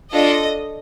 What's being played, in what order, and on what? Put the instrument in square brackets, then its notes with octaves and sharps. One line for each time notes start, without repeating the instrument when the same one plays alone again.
[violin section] D4 F4 A4 D#5